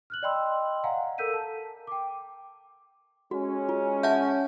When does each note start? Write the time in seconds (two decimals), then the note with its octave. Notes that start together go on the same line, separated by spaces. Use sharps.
0.10 F6 F#6 F#7
0.23 D5 D#5 G5 B5 C6 E6
0.84 F5 F#5 G#5 A#5
1.18 A4 A#4 E6 G6 B6 D#7
1.34 A5
1.87 G5 D6
3.31 G#3 C#4 F#4
3.69 F4
4.03 E5 F#5 A5 G6